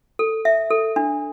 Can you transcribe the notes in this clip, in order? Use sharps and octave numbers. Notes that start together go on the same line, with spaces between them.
A4
E5
A4
D4